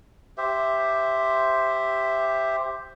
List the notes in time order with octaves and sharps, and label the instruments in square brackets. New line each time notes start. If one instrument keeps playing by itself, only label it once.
[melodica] G4 C5 E5